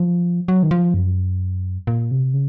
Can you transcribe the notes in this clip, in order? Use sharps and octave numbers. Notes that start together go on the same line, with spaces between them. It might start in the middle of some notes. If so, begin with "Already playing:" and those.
Already playing: F3
F#3
D#3
F3
F#2
A#2
C3
C#3